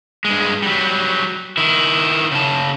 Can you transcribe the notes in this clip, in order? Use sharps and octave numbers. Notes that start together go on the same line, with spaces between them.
G2 G#3
F#3 G3
D#3 E4
C#3 A5